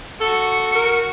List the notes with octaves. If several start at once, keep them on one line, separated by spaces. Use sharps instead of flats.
F#4 A4 C#7
A#4